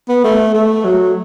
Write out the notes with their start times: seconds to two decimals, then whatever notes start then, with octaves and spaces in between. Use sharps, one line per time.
0.09 B3
0.24 A3
0.55 A3
0.85 F#3